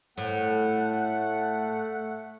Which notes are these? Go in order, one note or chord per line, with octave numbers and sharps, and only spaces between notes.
A2 A3 F#5